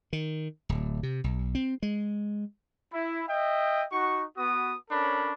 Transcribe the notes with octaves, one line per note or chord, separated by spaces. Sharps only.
D#3
D1
C3
B1
C4
G#3
E4
D#5 E5 G5
D#4 F#4 C#6
B3 F#4 D#6
C#4 D4 A4 A#4 C#5 B5